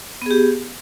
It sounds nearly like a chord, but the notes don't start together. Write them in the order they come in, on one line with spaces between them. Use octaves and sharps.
B3 G#4 G4